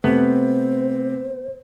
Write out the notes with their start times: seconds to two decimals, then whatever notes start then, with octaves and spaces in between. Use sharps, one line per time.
0.04 C3 A3 B3 C5